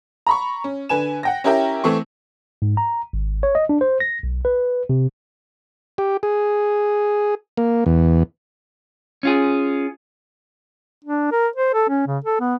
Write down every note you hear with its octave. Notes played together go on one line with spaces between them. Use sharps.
A#5 B5 C#6
C#4
D3 B4 G#5 E7
F#5 G5 A#6
C#4 E4 G4 A#4 E5 G5
E3 A3 C4 C#6
G#2
A#5
G#1
C#5
D#5
D4
C5
A#6
B1
B4
C3
G4
G#4
A#3
E2
C#4 F4 G#4
D4
A#4
C5
A4
C#4
C#3
A4
B3